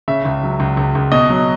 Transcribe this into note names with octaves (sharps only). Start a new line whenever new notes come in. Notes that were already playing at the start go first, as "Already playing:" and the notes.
C#3 E5
C#2
F#3
C#2
C#2
C#2
B2 D#5
F#3